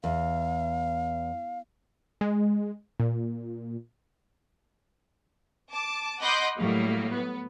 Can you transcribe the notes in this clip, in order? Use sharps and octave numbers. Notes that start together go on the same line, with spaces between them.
E2 F5
G#3
A#2
A5 D6
D#5 F#5 B5 C6 D6 G6
A2 F#3 G3 A#3
B3